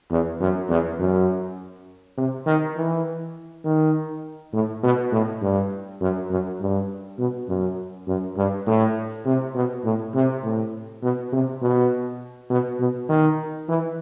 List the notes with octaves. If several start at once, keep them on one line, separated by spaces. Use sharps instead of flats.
E2
F#2
E2
F#2
C3
D#3
E3
D#3
A2
B2
A2
G2
F#2
F#2
G2
B2
F#2
F#2
G2
A2
C3
B2
A2
C3
A2
B2
C3
B2
B2
B2
D#3
E3